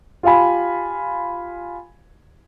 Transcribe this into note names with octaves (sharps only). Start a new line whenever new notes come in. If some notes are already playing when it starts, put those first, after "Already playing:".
F4 G4 F5 G#5 B5